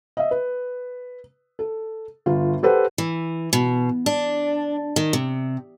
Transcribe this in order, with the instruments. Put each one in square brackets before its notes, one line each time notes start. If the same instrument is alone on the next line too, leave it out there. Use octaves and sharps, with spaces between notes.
[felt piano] D#5 E5
B4
A4
G1 F4
G4 A4 B4 C5 F#5
[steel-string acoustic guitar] E3
B2
D4
D#3
C3